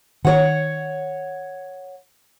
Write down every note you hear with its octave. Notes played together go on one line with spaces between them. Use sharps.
D#3 C#5 F#5